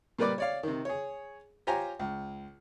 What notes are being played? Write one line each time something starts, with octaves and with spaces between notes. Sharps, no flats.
A#2 G3 A#4 B4 D5 D6
C#5 D5 F5
C3 D#3
G#4 C#5
F4 G4 C5 C#5 G#5 A#5
C#2